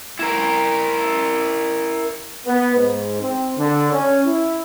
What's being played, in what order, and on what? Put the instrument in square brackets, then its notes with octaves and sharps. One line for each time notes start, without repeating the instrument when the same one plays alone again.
[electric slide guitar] E4 A#4
[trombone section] B3
G#2
C4
D3
C#4
E4